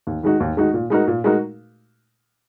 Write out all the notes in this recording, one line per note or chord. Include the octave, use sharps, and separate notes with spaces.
D#2
D#3 G#3 D#4 F#4
D#2
D#3 G#3 D#4 F#4
A#2
G#3 D#4 F#4 A#4
A#2
G#3 D#4 F#4 A#4